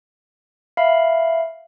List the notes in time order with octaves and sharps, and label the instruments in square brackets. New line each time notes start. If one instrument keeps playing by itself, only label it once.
[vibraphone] E5 [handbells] F5 B5